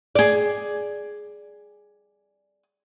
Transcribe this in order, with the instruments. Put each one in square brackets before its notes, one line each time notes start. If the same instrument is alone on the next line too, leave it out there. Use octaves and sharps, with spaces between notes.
[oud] G#4 D5